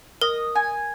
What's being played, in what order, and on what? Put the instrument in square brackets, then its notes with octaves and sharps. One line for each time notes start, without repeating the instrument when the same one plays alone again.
[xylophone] A#4 [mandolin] D#5
[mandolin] G#5